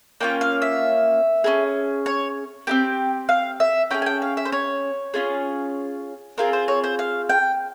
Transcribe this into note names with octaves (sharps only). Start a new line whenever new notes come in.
A#3 C#4 F4 G5
F5
E5
C#4 F4 G#4
C#5
C4 E4 G4 G5
F5
E5
C#4 F4 G#4 G5
G#5
G5
F5
E5
C5
C#5
C#4 F4 G#4
C4 F4 G#4 A#4
C5
C#5
C5
F5
G5